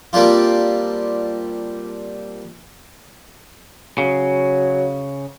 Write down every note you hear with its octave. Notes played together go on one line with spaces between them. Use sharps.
G3 A#3 C4 D4 F4
C#3 F#3